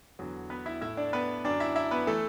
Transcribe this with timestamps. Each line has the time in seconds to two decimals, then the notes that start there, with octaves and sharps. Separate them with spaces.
0.19 E2 D3 F#3
0.50 B3 B4
0.66 E4 E5
0.81 A2 A3 E4 E5
0.97 D4 D5
1.13 B3 B4
1.44 F#2 D3 F#3 D4 D5
1.60 E4 E5
1.76 E4 E5
1.91 B3 B4
2.07 E3 A3 A4